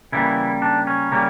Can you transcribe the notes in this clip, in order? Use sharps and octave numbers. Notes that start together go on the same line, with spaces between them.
C#3 E3 G3 A#3 E4
D4
C#4
C#3 G3 A#3